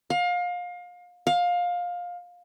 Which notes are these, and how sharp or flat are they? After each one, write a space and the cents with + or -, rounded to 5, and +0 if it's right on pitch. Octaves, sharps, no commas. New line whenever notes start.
F5 +30
F5 +20